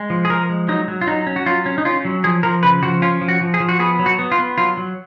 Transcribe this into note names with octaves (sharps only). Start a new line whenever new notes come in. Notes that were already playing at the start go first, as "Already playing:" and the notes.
Already playing: G#3
F3
G#4
F3 A#4
G#3
F#3 D#4
F#3
F4
F#3 D#4
C#4
F#4
F#3 F4
C#4
D#4
C#4 F4
F#3
F3 G#4
F3 A#4
C#3 B4
F3 F#4
C#4 F4
F3
F#4
F3
G#4
F3
F#4
B3 G#4
F#3
F#4
B3
F4
B3
F#3 F4
F#3